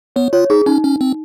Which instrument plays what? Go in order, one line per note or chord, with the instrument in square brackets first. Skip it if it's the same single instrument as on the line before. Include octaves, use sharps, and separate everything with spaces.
[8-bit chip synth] B3 [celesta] C#5
[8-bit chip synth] F4 [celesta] C#5
[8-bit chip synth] D#4 [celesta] G#4
[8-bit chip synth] C#4 [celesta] D#4
[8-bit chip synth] C#4
C4